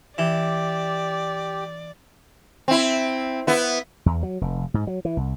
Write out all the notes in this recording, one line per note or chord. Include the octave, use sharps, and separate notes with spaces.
E3 G4 D5
C4 E4
B3 E4
E2
F#3
F1
G#2
F#3
E3
C2